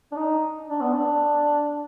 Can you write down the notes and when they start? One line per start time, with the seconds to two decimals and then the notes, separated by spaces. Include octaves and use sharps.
0.12 D4
0.16 D#4
0.70 D4
0.81 B3
0.93 D4